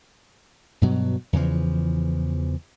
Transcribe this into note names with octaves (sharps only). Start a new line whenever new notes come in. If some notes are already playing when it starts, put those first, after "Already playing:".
G2 B2 F#3
E2 C#3 E3 F3